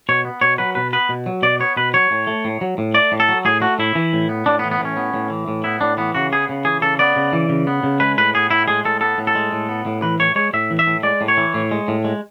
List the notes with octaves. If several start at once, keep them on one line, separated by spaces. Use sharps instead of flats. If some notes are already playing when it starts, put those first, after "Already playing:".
B2 C#5
B3
B2 C#5
F#3 B4
B2 B4
B3 B4
B2
F#3
B2 D5
B3 C#5
B2 B4
F#3 C#5
A2
A3
A2
F#3
A2
A3 D5
A2
A4
F#3
A2 G#4
A3 F#4
A2 E4
E3
A2
B3
A2 D4
B3
E3
B3
A2 C#4
B3
A2
E3
A2
B3 E4
A2 D4
E3 B3
C#3 F#4
B3 G#4
C#3
E3 G#4
C#3 A4
B3 D5
C#3
E3
C#3
B3
C#3
G#3 B4
A2 B4
B3 G#4
A2 E4
G#3 G#4
A2 A4
B3 A4
A2
A4
G#3
A2
B3
A2
E3 B4
A2 C#5
G#3 C#5
A2 E5
E3
E5
A2
G#3 D5
A2
C#5
E3
A2
G#3
A2
G#3